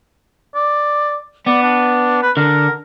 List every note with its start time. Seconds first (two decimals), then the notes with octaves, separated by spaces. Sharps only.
0.55 D5
1.47 B3 D5
1.62 D4
2.22 B4
2.37 D3 A#4